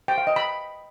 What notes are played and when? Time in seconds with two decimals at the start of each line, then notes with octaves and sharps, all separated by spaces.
0.08 G5
0.18 F5
0.27 D#5
0.36 B5